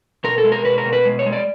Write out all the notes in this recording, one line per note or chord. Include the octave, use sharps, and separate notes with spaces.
B2 A#4
A4
G#3
A#4
B2 B4
A#4
B2
B4
G#3
C#5
G#3
D5